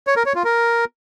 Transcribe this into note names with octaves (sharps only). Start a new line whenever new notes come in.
C#5
A#4
C#5
F4
A#4